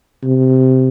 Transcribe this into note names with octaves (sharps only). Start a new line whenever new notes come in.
C3